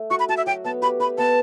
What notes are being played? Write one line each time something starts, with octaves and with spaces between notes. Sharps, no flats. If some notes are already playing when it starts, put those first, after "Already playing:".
Already playing: A3
F#4 C#6
B5
F#4 A5
E5
F#3 G5
B3 A5
G4 B5
B4 B5
B3 A5